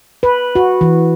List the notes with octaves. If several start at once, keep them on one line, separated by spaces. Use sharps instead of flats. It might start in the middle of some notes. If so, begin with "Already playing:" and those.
B4
F#4
E3